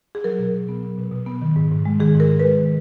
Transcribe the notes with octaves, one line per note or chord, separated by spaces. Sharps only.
G#4
F#3 A#4
B2
B2
B3
F#3
B2
B2
B3
D#3
G#2
G#2
G#3
D#3 G#4
G#2 A#4
G#2
G#3 B4
D#3